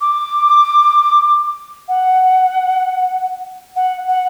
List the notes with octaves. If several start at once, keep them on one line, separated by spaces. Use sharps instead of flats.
D6
F#5
F#5
F#5